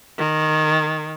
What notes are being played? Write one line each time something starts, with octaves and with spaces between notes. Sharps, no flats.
D#3